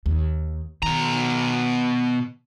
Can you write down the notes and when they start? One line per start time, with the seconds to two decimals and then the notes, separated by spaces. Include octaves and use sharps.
0.06 D#2
0.83 B2 D#3 A#5